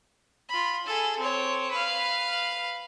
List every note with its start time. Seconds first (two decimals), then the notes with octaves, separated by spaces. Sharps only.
0.49 F4 B5
0.86 G#4 A4
1.18 C4 C#5
1.71 B4 F5